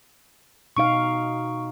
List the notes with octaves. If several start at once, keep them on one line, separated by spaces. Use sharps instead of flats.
B2 D#4 F5 C#6 D7